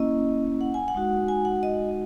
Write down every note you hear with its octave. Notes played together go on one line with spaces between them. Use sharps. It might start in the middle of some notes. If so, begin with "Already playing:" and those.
Already playing: A#3 C#4 E4 D#5
F#5
G#5
F#5
G#3 D#4 F#4
G#5
F#5
D#5